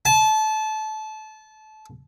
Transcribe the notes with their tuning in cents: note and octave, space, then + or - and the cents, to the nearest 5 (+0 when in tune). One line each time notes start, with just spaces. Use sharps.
A5 -25